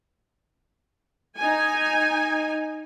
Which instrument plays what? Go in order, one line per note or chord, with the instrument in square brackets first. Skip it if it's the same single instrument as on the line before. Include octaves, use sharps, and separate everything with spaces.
[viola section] D#4 G#5